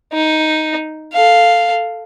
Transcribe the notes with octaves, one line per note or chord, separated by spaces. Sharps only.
D#4
A4 F5